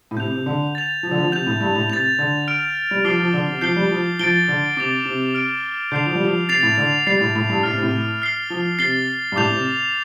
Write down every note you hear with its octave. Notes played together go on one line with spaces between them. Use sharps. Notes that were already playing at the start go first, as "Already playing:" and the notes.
A2
C3 G6 F7
C3
D3
A6 F7
F3
D3
F3
C3 G6 F7
A2
G2
A2
C3 A6 F7
D3
F6 D7 F7
G3
F3 D6 F6 A6 C7 G7
F3
D3
C3
F3 G6 C7 G7
G3
F3
F3 A6 D7 G7
D3
C3 D6 A6 F7
C3
F6 D7 F7
D3 G6 C7 F7
F3
G3
F3
C3 A6 C7 F7
A2
D3
G3 A6 C7 F7
A2
A2
G2
A2 F6 A6 C7
C3
A2
F6 C7 G7
F3
C3 A6 C7 G7
G2
A2 D6 G6 F7
C3